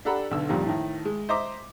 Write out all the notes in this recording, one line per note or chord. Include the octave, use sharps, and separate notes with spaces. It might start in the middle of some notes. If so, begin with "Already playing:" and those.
D4 G4 A4 F#5 A#5 B5
B1 D3 E6
F2 A#2 D#3 G3
A2 D#3
G#3
C5 D#5 E5 A#5 C6 D6